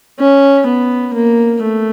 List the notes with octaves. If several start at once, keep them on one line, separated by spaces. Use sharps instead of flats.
C#4
B3
A#3
A3